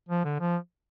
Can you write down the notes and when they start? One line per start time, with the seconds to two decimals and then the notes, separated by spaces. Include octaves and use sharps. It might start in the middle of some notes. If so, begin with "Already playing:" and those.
0.09 F3
0.25 D3
0.40 F3